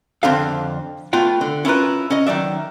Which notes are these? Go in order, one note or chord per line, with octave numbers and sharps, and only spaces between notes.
F2 D3 C4 D4 A4 F5
A3 B3 F4 F#5 G5
D3
C#4 E4 F4 A#4 B4
C#4 D#5
D#3 F#3 D5 E5